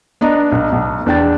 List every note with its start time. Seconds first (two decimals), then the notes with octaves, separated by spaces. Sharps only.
0.21 B3 D4 D#5 A#5
0.52 B1
0.72 B1
1.06 E2 D4 G5 A6